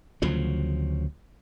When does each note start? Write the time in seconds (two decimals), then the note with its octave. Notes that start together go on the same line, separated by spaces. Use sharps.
0.22 D2 C#3 F3 F#3